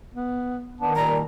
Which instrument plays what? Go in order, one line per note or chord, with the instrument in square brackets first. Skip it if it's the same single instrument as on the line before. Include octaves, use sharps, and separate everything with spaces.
[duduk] B3
[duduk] D#3 [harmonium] B3 D4
[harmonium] A#2 G3 [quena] A#5